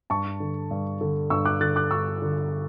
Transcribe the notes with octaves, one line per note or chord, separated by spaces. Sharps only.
G2 A5 C#6
D3
G2
D3
G2 C#6 E6
D6 F#6
D3 F#6 A6
D6 F#6
G2 C#6 E6
D3